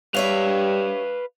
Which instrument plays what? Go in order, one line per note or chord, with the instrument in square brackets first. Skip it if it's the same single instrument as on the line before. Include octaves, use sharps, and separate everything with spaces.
[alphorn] G3 [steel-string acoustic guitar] G4 C#5 E5 [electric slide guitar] B4 F5